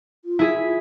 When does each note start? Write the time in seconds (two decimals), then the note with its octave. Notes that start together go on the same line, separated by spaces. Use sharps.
0.25 F4
0.39 E4 G#4 B6